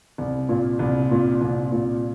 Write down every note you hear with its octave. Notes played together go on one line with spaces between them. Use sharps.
C2
A#2
C2
A#2
C2
A#2